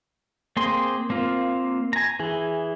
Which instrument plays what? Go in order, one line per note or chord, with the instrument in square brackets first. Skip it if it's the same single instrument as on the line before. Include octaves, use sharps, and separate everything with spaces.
[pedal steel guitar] A#3 C4 G#4 C6
A#3 C4 F4
G#5 A#5
E3 G#4